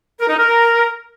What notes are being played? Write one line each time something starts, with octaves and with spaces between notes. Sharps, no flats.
A#4
D#4
A#4